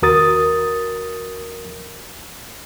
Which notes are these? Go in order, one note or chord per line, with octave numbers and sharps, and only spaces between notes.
D#2 F#4 A#4 D#6 A6